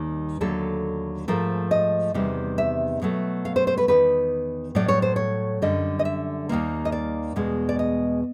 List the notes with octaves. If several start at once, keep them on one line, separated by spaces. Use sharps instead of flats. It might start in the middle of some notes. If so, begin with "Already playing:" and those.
Already playing: D#2 D#3 G3 A#3
D#2 D3 F#3 A3 A4
G#2 F3 A3 A#4
D#5
E2 C3 D#3 G3
E5
B2 F#3 A3
F5
C5
C5
B4
E2 C3 D#3 B4
A2 F#3 A3 D5
C#5
C5
C#5
F#2 D3 G3 D#5
D#5
E5
D#2 D#3 G3 A#3
D#5
D5
E2 B2 G#3
D5
D#5